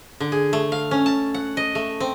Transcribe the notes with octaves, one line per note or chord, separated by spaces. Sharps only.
D3
G#4
A3
F5
C#4
A5
F#5
D#5
A3
C4